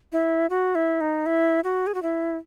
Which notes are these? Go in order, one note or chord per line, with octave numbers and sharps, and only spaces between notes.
E4
F#4
E4
D#4
E4
F#4
G#4
F#4
E4